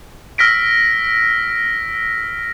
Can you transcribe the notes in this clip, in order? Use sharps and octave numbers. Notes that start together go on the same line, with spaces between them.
E6 F6 A#6 B6 D7